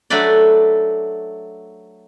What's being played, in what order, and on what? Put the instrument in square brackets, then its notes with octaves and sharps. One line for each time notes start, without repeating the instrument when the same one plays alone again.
[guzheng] F#3 A3 D4 B4 D5